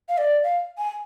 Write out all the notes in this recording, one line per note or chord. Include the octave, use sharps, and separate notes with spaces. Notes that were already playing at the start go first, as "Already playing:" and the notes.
F5
D5
F5
G#5